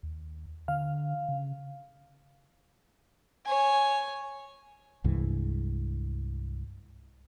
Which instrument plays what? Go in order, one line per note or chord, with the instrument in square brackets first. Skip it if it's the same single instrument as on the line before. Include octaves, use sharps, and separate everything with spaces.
[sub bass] D#2
[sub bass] D3 [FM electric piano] F5
[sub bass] C#3
[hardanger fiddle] C#5 G#5
[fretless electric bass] C2 G2 E3 G#3